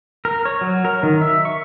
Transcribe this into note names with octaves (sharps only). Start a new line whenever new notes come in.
A#4
C#5
F#3
A#4
D#3
E5
C#6